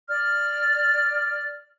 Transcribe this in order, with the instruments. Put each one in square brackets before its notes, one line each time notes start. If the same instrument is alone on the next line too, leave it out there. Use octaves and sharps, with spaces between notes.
[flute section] D5 F6